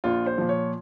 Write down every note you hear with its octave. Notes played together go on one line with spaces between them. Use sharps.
A#1 F4
C5
A#2 F3
C#5